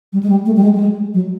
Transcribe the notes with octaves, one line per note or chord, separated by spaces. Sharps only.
G3
G#3
G3
A3
G3
G#3
G3
G#3
F#3